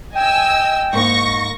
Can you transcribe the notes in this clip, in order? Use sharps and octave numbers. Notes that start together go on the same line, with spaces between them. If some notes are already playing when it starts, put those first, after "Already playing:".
D#5 G5 G#5 E6
G#2 A#3 D#4 C#6 A#6